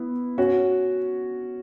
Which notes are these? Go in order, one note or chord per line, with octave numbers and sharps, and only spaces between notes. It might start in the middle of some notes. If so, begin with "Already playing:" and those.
Already playing: B3 E4
C#4 F#4